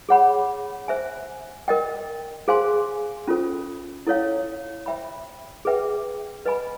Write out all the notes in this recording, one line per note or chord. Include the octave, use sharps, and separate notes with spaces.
G#4 C#5 F#5 B5
C5 E5 G#5
A#4 D#5 G5
G#4 C5 F5 G#5 C6
C#4 F4 A4 C5
E4 A4 C#5 F5
C5 E5 G5 B5
G#4 B4 E5 G5
B4 D#5 G#5 B5